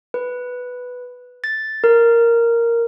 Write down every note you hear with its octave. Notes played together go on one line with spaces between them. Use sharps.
B4
A6
A#4